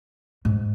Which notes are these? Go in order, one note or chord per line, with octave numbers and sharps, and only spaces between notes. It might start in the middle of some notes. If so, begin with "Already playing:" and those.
G#2